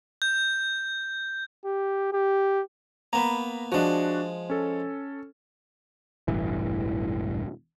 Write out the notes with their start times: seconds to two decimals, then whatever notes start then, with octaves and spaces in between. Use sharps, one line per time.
0.22 G6
1.65 G4
2.13 G4
3.13 A#3 B3 A#5 B5
3.72 F3 G#3 D4 F#4
4.50 C#4 A4
6.28 E1 A1 G2 E3